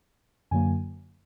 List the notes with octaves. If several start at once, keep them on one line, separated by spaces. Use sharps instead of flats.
F#2 D3 F#3 A#3 G#5